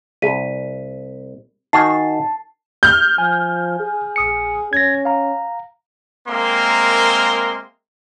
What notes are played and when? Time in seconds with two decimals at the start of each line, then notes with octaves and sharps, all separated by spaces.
0.22 C2 G#4 B6 D#7
1.73 D#3 F#4 G#5 A5 C7
2.83 F6 G6
3.18 F3 G#5
3.80 G#4
4.16 A#1 D#6 C#7
4.73 C#4 G#6 A#6
5.05 F5 A#5
6.28 G#3 A#3 C4 A#4 E5 C6